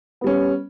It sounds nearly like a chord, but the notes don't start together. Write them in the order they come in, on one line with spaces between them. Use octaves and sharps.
B3 G3 C#4